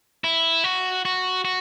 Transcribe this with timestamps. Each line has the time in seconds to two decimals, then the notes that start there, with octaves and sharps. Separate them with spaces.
0.24 E4
0.64 F#4
1.05 F#4
1.45 F#4